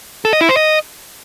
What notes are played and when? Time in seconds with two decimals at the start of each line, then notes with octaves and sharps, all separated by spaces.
0.25 A4
0.33 D#5
0.41 E4
0.49 C5
0.57 D#5